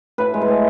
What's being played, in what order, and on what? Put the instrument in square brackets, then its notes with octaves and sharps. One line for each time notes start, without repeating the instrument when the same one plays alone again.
[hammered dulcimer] A2 B4
G#3
B4
A2